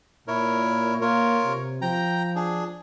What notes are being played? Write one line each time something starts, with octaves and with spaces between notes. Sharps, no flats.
A#2 E4 A#4 C#5
A#3 F4 A#4 C#5
C3
F3 G5 A#5
D4 G#4